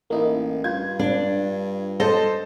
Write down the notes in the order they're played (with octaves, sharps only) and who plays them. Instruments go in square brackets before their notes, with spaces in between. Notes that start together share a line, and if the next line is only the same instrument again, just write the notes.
[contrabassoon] A1 [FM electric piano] A#3 D#4 E4
[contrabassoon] G2 [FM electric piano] F4 [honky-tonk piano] G#6
[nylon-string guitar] D4
[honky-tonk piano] A4 C5 [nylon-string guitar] D#5